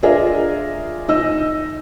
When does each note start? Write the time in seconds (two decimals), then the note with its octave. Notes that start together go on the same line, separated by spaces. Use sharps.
0.03 D4 F4 G#4 A#4 D#5 E5
1.09 D#4 D#5 E6